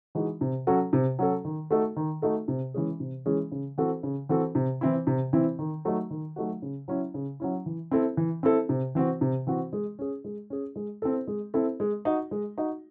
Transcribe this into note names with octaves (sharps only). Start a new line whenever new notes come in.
E3 G#3 D#4 F#4
C3
F#3 C#4 F#4 A4
C3
F#3 C#4 F#4 A4
D#3
A3 D#4 F#4 A4
D#3
A3 D#4 F#4 A4
C3
E3 G#3 C#4 G#4
C3
E3 G#3 C#4 G#4
C#3
E3 C4 F#4 A4
C#3
E3 C4 F#4 A4
C3
E3 C4 E4
C3
E3 C4 E4
D#3
F#3 A3 D#4 F#4
D#3
F#3 A3 D#4 F#4
C#3
F#3 C#4 E4
C#3
F#3 C#4 E4
E3
C4 E4 A4
E3
C4 E4 A4
C3
E3 C4 F#4
C3
E3 C4 F#4
G#3
C#4 G#4
G#3
C#4 G#4
G#3
C4 E4 A4
G#3
C4 E4 A4
G#3
D#4 F#4
G#3
D#4 F#4